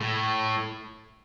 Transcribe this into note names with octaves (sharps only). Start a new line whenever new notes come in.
A2